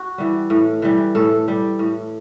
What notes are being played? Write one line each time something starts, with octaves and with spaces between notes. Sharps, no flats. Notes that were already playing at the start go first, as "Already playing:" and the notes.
Already playing: F#4
E3 G3
A2
E3 G3
A2 A4
G3
A2